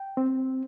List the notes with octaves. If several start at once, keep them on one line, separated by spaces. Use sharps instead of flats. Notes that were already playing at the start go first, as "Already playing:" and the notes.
Already playing: G5
C4